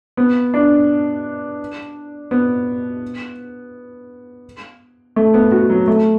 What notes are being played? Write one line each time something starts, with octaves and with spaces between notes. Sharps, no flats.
B3
D4
B3
A3
B3
F#4
F#3
A3